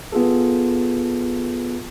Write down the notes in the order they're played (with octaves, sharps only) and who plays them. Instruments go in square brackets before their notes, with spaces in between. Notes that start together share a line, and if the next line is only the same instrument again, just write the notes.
[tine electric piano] B3 F4 G#4 A4